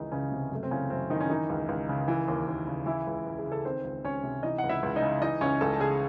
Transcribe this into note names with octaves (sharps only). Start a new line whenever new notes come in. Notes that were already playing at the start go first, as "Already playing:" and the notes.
Already playing: C#2 D#3 E3 D#4
C#2 C#3 C#4
C3
F#2 A3
C4
C#3 E3 C#4
F#2 C4
D#3 E3 D#4
C#4
D#3 E3 D#4
C#2
C#2
C#3
E3
D#2
D#2
C#3
E3 E4
C#2
C#2
G#4
C#3
A4
D#3 C4 C5
C#2
C#2 C#4 C#5
C3
E3 D#4 D#5
C#2 F#5
E4 E5
C#2
D#4 D#5
C#3
E3 D#4 D#5
C#2 C#4 C#5
C#2 A4 A5
A5
C#3 G#4 G#5